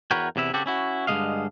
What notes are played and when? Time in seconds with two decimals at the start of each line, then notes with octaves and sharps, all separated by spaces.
0.11 E2 F#4 A#4 B4 C#5 G5
0.36 E2 C3 E4 E5
0.53 C#3 C4 F#4 G4 A4
0.66 C#4 E4 F#4
1.07 G2 D3 D#3 G#3 D#5 F5